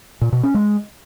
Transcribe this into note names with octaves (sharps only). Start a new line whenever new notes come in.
A#2
B2
C#4
G#3